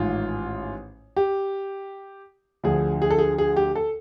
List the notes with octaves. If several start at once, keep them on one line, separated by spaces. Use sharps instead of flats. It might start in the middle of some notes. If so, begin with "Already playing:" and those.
Already playing: A1 G#2 D#3 F4
G4
D2 D3 F3 G#4
G#4
A4
G#4
G#4
G4
A4